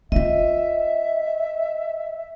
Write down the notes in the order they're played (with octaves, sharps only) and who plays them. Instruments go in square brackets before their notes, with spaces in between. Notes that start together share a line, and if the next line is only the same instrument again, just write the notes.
[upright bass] C4 F4 [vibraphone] D#5 [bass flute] E5